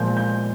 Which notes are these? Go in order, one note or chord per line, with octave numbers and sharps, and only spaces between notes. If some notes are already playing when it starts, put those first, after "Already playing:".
Already playing: A#2 F3 G#3 G6
G6